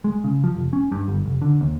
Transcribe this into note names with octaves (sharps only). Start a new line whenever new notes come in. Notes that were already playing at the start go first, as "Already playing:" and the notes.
G#3
C#3
F3
F1
C#4
G2
G1
F1
D3
D#2